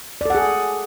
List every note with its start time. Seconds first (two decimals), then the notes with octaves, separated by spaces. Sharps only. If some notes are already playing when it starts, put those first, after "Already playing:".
0.21 D5
0.25 A4
0.30 F#5
0.35 G#4